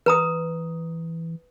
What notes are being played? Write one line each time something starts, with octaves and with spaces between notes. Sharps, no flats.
E3 B4 A#5 D#6